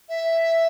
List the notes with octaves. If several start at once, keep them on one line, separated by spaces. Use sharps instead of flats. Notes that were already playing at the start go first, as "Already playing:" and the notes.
E5